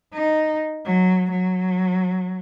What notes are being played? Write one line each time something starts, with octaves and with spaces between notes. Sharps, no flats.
D#4
F#3
F#3